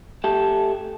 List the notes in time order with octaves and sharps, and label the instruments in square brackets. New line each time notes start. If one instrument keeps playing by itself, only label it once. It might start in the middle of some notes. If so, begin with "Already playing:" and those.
[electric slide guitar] A3 G4 A5